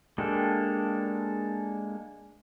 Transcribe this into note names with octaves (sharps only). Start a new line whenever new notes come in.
G#3 A#3 D4 G4 A4